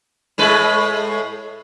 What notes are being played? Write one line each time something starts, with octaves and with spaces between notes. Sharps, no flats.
A2 G#3 B4